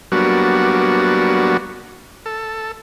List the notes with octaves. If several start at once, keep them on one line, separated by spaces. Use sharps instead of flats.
F#3 G3 A#3 B3 D4 F#4
A4